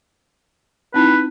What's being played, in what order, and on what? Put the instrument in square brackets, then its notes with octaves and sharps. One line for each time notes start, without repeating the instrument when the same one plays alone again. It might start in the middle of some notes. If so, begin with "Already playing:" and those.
[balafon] C4 D#4 E4 [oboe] B4